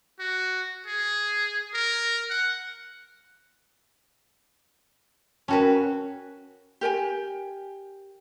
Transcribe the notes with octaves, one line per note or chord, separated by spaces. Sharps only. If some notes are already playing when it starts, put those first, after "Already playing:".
F#4
G#4
A#4
F#5
C#4 F#4 A#4 B4 G5 A5
G4 A#4 G5 G#5